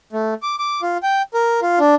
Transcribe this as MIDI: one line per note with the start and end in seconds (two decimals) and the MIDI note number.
0.13 0.34 57
0.43 0.56 86
0.59 0.81 86
0.82 0.98 65
1.03 1.22 79
1.34 1.60 70
1.62 1.79 65
1.79 1.95 62